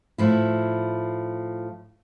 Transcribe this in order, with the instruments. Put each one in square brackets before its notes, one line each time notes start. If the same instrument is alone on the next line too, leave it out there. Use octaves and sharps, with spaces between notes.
[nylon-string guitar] A2 F3 E4